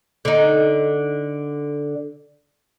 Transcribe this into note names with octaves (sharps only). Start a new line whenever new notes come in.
D3 D#4